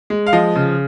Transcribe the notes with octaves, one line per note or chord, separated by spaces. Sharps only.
G#3
F5
F3 D#5
C#3